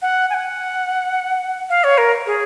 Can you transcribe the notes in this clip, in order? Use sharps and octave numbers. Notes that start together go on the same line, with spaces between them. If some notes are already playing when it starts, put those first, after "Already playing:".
F#5
G#5
F#5
F5
C#5
A#4
G#4